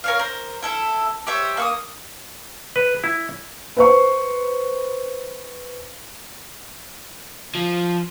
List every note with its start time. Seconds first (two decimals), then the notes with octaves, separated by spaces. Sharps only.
0.04 A#4 C#5 F5
0.19 A#4 C5
0.62 E4 A4 E5
1.27 G4 C5 C#5 E5
1.57 A#3 C#6 D#6
2.76 B4
3.04 E4
3.77 B4 C5 C#6
7.55 F3